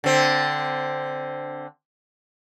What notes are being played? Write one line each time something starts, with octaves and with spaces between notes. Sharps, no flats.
D3 C4